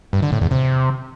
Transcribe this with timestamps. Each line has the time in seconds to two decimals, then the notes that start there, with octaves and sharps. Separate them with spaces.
0.13 G2
0.23 D3
0.32 A2
0.42 E2
0.51 C3